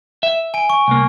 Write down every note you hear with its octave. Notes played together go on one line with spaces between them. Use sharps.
E5
G#5 D7
C#6
C2 A#3